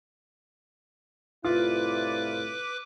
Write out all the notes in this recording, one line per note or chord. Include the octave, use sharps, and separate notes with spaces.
C2 A2 E4 F4 B4 D6